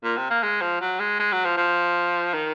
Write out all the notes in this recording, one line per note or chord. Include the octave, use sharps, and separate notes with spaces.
A#2
C3
A#3
G#3
F3
F#3
G#3
G#3
F#3
F3
F3
D#3